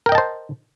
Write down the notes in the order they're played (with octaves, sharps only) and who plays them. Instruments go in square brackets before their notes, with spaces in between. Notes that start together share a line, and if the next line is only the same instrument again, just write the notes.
[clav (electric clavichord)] A#4
G5
D#5
A5
C5